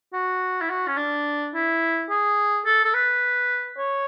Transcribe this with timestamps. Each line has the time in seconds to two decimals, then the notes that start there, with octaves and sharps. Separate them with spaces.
0.13 F#4
0.61 E4
0.69 F#4
0.88 C#4
0.97 D4
1.54 E4
2.10 G#4
2.65 A4
2.85 A4
2.94 B4
3.78 C#5